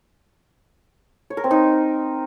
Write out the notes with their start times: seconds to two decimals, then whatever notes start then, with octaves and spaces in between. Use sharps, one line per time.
1.30 C#5
1.37 A#4
1.44 C4
1.51 D#4